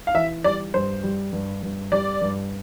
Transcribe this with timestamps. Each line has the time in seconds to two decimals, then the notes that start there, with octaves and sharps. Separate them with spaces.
0.07 F5
0.14 E3 E5
0.44 G3 D5
0.74 G2 C5
1.03 G3
1.33 G2
1.63 G2
1.92 G3 D5
2.22 G2